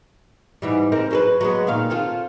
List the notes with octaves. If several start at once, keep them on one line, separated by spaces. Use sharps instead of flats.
G#2 E3 G3
C4 D#4 A#4
F#3 A4 B4
F#3 G#3 B3
A#2 D#3 F5
C4 F4 A4